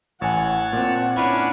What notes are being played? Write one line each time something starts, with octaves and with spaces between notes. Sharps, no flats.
A1 C#5 F#5 G#5 A5
A#2 C4
C#4 D4 E4 B4 C#5